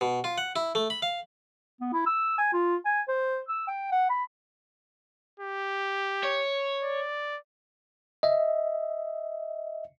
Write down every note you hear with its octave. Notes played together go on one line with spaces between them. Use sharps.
B2
F4
F#5
E4
A3
B5
F5
B3
E4
E6
G#5
F4
G#5
C5
E6
G5
F#5
B5
G4
C#5
D5
D#5 E5